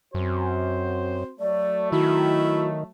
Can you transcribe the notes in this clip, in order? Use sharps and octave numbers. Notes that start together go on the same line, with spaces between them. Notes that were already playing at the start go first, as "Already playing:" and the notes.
F#2 C4 F#4 C5
F#3 A3 D5
D#3 E4 F#4